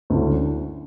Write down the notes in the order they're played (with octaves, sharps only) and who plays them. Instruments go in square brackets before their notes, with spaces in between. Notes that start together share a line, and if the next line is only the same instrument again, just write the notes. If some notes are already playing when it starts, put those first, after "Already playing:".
[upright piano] D2 D3 A3 C#4 E4